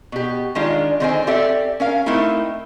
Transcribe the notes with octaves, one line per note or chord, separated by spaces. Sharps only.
B2 G4
D#3 G#3 D4 F4
D3 D#3 C4 C5 D#5 G#5
C4 G4 A4 D5 E5
C#4 A#4 F5
A3 C4 D#4 E4 A#4